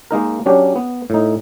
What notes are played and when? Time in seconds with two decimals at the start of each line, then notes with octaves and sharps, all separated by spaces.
0.11 G#3 A#3 D#4 A#4
0.46 F#3 C#4 D4 G4
0.76 B3
1.10 A2 D#4